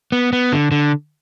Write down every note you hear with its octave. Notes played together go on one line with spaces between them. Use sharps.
B3
B3
D3
D3